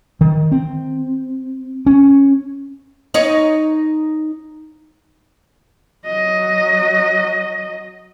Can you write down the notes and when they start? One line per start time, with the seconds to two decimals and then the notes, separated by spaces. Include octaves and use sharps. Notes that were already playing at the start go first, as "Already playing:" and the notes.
0.21 D#3
0.52 C4
1.86 C#4
3.14 D#4 C#5
6.06 F#3 D#5